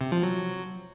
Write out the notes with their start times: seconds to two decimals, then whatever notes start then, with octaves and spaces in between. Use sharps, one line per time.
0.01 C3
0.12 F3
0.23 F#3